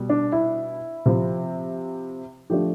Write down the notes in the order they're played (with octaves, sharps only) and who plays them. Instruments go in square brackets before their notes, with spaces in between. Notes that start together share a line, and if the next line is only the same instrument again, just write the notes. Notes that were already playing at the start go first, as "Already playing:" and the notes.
Already playing: [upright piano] B2 G3
D4
E4
C3 F3 C4
F3 A3 D4 G4